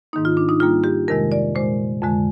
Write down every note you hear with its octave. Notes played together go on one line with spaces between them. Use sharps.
G#2 D#3 A#3 D#4
F4
D4
D#4
G#2 G3 A#3 F4
G4
F2 C3 D#3 G#3 A#4
D5
A#2 G#3 C5
F2 D3 G#3